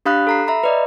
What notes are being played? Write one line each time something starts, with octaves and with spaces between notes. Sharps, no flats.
D4 G4 F5 B5 D#6 F#6
A4 A#5 C7
E5 A#5 B5
B4 D5 D#5